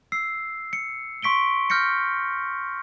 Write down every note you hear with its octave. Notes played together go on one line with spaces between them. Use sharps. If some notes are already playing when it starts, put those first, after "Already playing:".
E6 C7
C#7
C6 C#6 B6 D7 G7
F6 G6 A#6 C#7